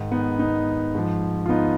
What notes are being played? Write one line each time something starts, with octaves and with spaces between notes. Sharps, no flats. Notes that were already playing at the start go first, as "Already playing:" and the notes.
Already playing: G#2 D#3
B3 D#4
B3 D#4
G#2 F3
F4
B3 D#4